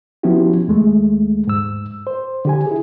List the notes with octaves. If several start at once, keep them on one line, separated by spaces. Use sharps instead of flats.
F3 B3 C#4 E4 F#4 G4
D#2 G#3 A3
G#2 E6
C5
D3 G4 G#5
E4 G#4